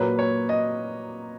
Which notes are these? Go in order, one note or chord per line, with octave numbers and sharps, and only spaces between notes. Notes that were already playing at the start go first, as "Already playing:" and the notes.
Already playing: A#2 F#3 A#3 B4
C#5
D#5